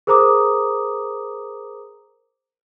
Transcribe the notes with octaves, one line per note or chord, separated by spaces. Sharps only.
G#4 A#4 C5 A#5 D6 D#6